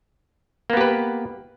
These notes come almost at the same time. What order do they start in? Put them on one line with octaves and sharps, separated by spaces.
A#3 B3 G4 B4